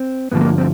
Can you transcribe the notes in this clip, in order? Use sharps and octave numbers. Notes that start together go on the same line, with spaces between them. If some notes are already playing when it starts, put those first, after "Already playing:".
Already playing: C4
G2 D3 F3 A3 B3
A#3
C4